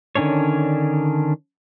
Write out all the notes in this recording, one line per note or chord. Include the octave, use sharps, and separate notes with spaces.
D3 D#3 C#4 D4 C#5